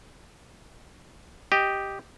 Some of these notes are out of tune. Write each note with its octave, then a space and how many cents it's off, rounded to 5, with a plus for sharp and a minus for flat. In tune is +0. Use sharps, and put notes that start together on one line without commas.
G4 +0 D#5 +0